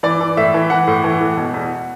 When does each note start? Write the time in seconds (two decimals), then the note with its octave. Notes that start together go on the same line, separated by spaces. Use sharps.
0.03 E3 D5
0.21 E3
0.37 A2 E5
0.54 E3
0.70 E3 F#5
0.88 A2
1.04 E3
1.21 A2
1.37 B2
1.54 E2